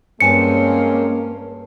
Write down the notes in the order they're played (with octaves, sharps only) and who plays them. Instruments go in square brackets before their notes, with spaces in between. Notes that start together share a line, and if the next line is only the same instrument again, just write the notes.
[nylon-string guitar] G2 G#5 A5 [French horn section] G#3 C4 C#4 [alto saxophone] A#3 [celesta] C#7